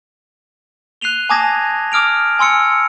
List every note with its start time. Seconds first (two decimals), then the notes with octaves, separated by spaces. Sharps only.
1.01 F#6 C7 D#7 F7 G7
1.30 G#5 A5 D6 D#6 G#6 A#6
1.92 D6 D#6 F6 D7 F7
2.39 G#5 C6 E6 C#7